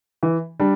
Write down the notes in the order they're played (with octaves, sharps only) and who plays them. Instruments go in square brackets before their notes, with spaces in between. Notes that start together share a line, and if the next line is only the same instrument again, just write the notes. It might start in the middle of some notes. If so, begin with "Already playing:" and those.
[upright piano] E3
G3 D4